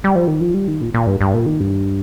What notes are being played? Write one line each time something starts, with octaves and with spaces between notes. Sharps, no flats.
G3
F3
D#3
F3
G3
D#3
A#2
A#2
G2
G2
A#2
D#3
G2